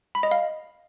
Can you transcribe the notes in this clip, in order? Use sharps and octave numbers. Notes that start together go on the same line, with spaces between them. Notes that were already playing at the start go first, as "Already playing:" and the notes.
B5
D#5
F5